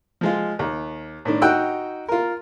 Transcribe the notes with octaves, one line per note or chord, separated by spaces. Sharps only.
F3 G#3 F4
D#2
A2 D#3 D4
D#4 F#4 G5 E6 F#6
F4 A#4